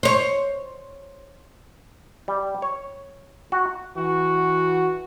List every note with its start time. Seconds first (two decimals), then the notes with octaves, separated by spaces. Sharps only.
0.03 C5 C#5
2.28 G3
2.62 C#5
3.52 F#4
3.96 E3 F#4